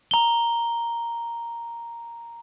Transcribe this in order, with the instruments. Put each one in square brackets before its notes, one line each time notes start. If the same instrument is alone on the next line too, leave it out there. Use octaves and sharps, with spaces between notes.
[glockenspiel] A#5 G7